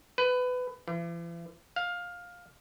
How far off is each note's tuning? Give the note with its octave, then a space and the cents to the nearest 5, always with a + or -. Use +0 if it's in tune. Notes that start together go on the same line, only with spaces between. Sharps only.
B4 +20
E3 +45
F5 +15